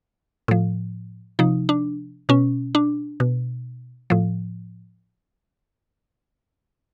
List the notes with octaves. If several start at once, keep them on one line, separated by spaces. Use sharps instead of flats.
A2 F3
C3 F3 D#4
D4
B2 C#4
D4
B2
A2 F3